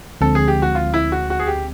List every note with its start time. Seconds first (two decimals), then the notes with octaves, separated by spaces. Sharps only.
0.21 D2 D3 F3 G#3 C4 A4
0.35 G#4
0.48 G4
0.62 F#4
0.75 F4
0.94 E4
1.12 F#4
1.30 F#4
1.40 G#4
1.47 G4